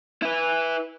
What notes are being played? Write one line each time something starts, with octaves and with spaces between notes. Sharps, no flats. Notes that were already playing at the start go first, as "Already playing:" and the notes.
E4 B4